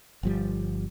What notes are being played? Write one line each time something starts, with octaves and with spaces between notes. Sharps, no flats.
G1 F3 G3